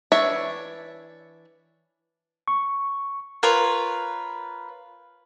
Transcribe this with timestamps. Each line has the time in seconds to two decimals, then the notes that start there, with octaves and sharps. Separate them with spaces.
0.12 E3 D4 C#5 E5
2.48 C#6
3.43 F4 A#4 B4 C#5